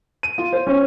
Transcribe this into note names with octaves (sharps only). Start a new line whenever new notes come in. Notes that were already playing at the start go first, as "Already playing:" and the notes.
D#7
F4
C5
C#4